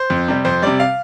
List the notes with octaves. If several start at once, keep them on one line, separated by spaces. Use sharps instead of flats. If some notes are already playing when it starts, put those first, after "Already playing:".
Already playing: C5
F2
C3 G3
F2 C5
C3 G3 D5
F5